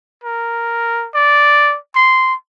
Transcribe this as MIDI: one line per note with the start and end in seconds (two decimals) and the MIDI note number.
0.24 1.07 70
1.14 1.77 74
1.96 2.34 84